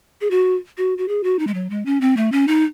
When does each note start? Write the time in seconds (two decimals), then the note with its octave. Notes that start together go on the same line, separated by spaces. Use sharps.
0.21 G#4
0.31 F#4
0.78 F#4
0.98 F#4
1.08 G#4
1.23 F#4
1.39 D#4
1.47 G#3
1.54 F#3
1.70 G#3
1.86 C#4
2.01 C4
2.17 A3
2.32 C#4
2.48 D#4